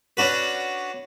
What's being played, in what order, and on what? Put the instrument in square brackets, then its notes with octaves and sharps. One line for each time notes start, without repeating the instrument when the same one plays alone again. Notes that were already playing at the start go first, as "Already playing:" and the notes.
[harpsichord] C#4 D4 F#4 B4